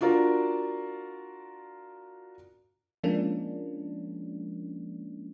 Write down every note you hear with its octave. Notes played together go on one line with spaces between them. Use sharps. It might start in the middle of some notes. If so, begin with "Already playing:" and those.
D4 F4 F#4 A#4 D5
F3 G#3 A#3 C#4 D4